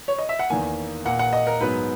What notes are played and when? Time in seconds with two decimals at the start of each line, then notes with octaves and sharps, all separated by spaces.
0.08 C#5
0.18 D#5
0.29 E5
0.39 F#5
0.50 E2 D#3 A#3 G#5
1.05 A#2 A#3 F#5
1.19 F#5
1.33 D#5
1.47 A#4
1.61 G#2 F#3 B3 B4